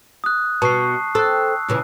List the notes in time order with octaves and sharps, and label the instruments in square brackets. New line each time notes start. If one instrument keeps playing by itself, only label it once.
[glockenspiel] D#6 F#6
[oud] B2 [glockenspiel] A5 C#6 C7
[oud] C4 A4 [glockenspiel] E6 F#6
[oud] A#2 C#3 E3